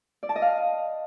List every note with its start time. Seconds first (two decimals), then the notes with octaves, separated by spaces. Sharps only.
0.23 D5
0.29 A5
0.36 D#5
0.42 F5